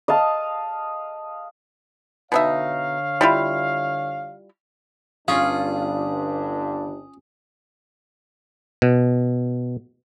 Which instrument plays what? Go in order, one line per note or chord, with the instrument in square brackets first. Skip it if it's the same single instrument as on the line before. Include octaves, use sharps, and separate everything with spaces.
[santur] D#5 F5 A5 D#6
[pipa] B2 D#4 E5 [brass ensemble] D3 C#5 F5
[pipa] G3 E4 F4
[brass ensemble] G1 G2 D4 [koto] C#4 F4 [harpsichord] G#4 [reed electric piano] F5
[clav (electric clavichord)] B2